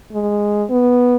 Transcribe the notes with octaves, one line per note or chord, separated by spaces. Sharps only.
G#3
B3